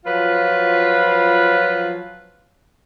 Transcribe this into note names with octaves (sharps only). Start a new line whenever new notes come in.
F3 F#3 F4 B4